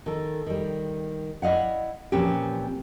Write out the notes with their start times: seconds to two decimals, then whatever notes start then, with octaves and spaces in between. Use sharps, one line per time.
0.06 D#3 A4
0.47 D#3 G3
1.42 E4 D5 D#5 F5 F#5
2.12 A#2 E3 F3 C4 C#4 G4